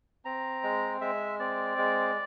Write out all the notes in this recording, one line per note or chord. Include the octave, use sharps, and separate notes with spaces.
C4 A#5
G#3
G#3 E5
C4 D5
G#3